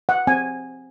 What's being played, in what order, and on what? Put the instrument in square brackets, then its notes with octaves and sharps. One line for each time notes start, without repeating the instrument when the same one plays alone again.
[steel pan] F#5
C4 G#5